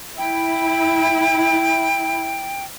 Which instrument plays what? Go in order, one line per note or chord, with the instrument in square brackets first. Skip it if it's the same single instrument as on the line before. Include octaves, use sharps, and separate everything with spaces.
[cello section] E4 [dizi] G5